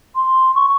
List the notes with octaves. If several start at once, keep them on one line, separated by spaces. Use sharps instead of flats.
C6
C#6